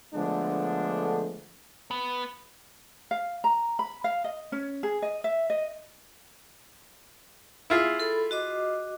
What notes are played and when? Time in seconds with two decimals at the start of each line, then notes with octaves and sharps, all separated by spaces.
0.14 D3 F3 G#3 A3 B3 D4
1.91 B3
3.11 F5
3.44 A#5
3.79 B5
4.04 F5
4.24 D#5
4.52 C#4
4.83 G#4
5.02 D#5
5.24 E5
5.50 D#5
7.70 E4 F4 G#4
8.00 A4 B5
8.31 F#4 D#5 D6